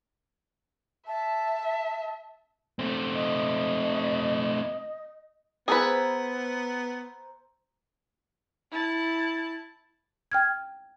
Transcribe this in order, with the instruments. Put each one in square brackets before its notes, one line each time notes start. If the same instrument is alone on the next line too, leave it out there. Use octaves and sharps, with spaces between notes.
[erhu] E5 [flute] A5
[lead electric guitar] A3 C4
[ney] D#5
[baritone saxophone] B3 [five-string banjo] G#4 B4 [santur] C5 A#5 E6
[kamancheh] E4 A5
[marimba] G5 F6 G#6